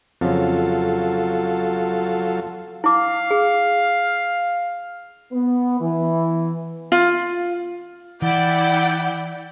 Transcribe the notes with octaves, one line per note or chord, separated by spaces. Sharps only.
F2 C#3 F#3 F4 A4
E4 F5 D6
G#4
B3
E3
F4
E3 E4 D5 F#5 G5